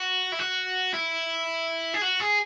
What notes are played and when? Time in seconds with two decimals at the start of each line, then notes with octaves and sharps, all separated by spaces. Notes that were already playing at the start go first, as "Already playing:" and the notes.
Already playing: F#4
0.32 E4
0.39 F#4
0.93 E4
1.94 G#4
2.02 F#4
2.20 G#4